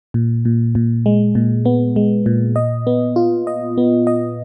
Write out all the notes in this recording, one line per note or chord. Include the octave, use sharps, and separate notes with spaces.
A#2
A#2
A#2
G#3
A#2
B3
G#3
A#2
D#5
B3
F4
D#5
B3
D#5